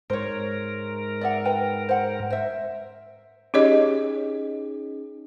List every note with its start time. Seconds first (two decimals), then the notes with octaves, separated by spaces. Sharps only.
0.10 G#2 A#4 C5 C#5
1.21 D5 E5 F#5
1.45 B4 G5
1.89 C5 F#5
2.30 C5 E5
3.54 C#4 D#4 G4 G#4 C#5 D#5